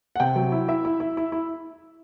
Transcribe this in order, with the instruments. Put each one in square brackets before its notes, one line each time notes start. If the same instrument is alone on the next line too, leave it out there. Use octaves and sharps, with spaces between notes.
[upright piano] F#5
C3 G5
F#3
E4
E4 E5
E4
E4
E4
E4